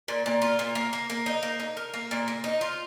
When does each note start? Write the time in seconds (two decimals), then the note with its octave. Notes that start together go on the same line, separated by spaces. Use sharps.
0.08 A#2
0.26 A#2
0.42 F4
0.59 A#2
0.75 A#3
0.93 A#3
1.10 A#3
1.26 D#4
1.43 A#3
1.60 D#4
1.77 A#4
1.94 A#3
2.11 A#2
2.28 A#3
2.44 D#4
2.61 F4